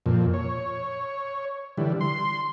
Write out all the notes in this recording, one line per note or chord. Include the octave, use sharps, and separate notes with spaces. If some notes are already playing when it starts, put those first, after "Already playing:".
F2 A#2
C#5
D3 E3 G3
C6